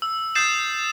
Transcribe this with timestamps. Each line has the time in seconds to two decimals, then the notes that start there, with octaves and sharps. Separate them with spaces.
0.02 E6
0.35 D#6 G6 A6 C7 E7